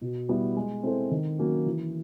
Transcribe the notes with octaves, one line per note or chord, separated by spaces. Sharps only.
B2
G3 B3 E4 G4
G#3
C4 E4 A4 C5
D#3
F#3 A#3 C#4 F#4
E3